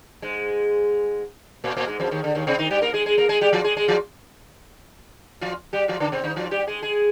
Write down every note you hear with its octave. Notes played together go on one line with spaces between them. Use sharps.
G#2 G#3
A#2 A#3
A#2 A#3
G#2 G#3
F2 F3
D#2 D#3
D3
D#2 D#3
C3 C4
D#3 D#4
G3 G4
A#3 A#4
G#3 G#4
G#3 G#4
A#3 A#4
G#3 G#4
G3 G4
F3 F4
G#3 G#4
G#3 G#4
F3 F4
F3 F4
G3 G4
F3 F4
D3 D4
C3 C4
D#3 D#4
F3 F4
G3 G4
G#3 G#4
G#3 G#4